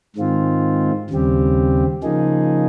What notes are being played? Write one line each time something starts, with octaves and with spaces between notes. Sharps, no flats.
G#2 D#3 G#3 C4 F4
D#2 C#3 G3 C4 G4
C#3 F3 A#3 D#4 G#4